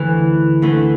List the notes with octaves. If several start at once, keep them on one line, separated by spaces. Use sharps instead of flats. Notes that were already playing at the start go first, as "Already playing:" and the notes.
Already playing: D2 D3 E3 A3 E4 B4
D2 D3 A3 E4 B4